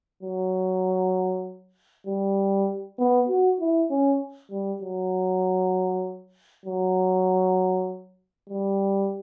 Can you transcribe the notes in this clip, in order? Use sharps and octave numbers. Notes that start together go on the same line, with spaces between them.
F#3
G3
B3
F#4
E4
C#4
G3
F#3
F#3
G3